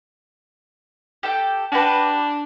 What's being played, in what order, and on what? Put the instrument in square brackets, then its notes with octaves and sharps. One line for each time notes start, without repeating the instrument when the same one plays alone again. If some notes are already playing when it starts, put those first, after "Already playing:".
[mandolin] G4 A4 G5
[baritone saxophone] D4 [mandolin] F#4 G4 B4